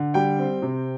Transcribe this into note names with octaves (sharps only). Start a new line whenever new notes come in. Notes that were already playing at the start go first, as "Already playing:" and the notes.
Already playing: D3
G3 G5
C4
C3